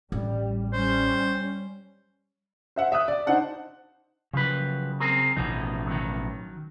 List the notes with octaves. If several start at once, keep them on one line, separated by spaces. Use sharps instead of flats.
A1 G3
G3 C#4 C5
C5 E5 F#5
E5 D#6 F#6
D5
D4 D#4 C5 F#5 A5
C#3 F3 F#3 B4
C4 G#4 A#4
A1 B2 F3 D#4
D#3 F#3